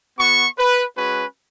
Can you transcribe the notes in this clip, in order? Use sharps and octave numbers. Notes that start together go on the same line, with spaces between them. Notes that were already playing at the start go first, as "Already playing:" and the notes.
B3 F#4 C#6
B4
G#3 C#4 F#4 B4